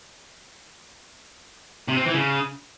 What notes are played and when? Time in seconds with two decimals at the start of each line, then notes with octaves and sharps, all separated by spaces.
1.88 C3
1.97 C4
2.05 E3
2.14 C#3